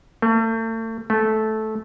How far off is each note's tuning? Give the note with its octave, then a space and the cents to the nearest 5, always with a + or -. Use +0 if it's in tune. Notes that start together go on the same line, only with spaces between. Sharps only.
A3 +40
A3 -10